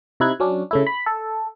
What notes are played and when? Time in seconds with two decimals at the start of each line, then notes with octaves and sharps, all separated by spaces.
0.20 C3 D#4 E4 F#6 G#6
0.40 F#3 C#4 D4
0.71 C#3 A3 E4
0.87 B5
1.06 A4